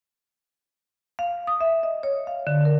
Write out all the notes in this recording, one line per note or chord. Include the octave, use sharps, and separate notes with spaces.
F5
D#6
E5
D#5
C#5
F5
D3
A#4